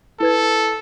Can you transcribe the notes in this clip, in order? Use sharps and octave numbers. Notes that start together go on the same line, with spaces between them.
E4 A4 B4 G#6